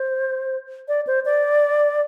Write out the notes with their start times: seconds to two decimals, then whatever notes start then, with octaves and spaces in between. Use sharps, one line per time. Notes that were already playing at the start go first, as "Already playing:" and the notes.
Already playing: C5
0.88 D5
1.07 C5
1.25 D5